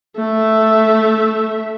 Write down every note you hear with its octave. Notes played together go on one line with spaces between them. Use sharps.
A3 E5